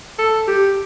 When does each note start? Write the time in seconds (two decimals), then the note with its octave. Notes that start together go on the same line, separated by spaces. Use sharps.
0.19 A4
0.48 G4